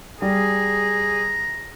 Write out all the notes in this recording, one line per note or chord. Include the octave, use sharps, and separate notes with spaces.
G3 G#4 A#5